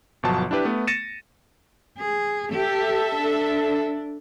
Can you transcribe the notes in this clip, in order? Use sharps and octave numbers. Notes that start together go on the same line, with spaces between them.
G1 B2 F3 F#3 A5
D4 E4 G4 B4
A3 B3
A6 A#6 C#7 D#7 E7
G#4
G4 A4 E5
D4